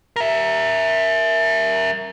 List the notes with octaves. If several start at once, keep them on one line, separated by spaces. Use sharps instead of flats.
A#4 E5